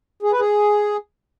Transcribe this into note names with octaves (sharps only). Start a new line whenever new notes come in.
G#4
B4
G#4